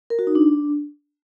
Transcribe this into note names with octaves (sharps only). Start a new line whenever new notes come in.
A#4
F#4
D#4
D4